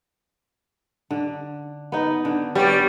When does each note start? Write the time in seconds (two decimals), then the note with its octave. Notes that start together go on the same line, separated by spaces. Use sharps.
1.11 D3
1.92 B3 D#4
2.25 D3
2.55 G3 B3 C#5 D5